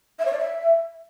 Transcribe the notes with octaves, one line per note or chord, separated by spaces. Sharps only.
E5
C#5
D5
E5